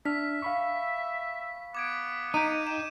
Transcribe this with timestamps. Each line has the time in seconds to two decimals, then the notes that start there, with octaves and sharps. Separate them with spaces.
0.05 D4 E5 F6 B6
0.42 F5 B5 C#6
1.75 B3 D6 G#6 D7
2.34 D#4 G6 D7 D#7
2.67 G5 E7